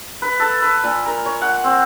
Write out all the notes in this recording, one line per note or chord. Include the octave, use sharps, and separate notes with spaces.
B4
A4
B4
A#2
A#4
C#5
F#5
C4